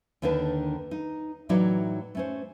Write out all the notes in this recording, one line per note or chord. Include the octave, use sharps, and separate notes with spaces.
D#2 D3 D#3 D4 B4 A5
D#4
A2 E3 F#3 D#4 C#5 D5
A3 C#4 C5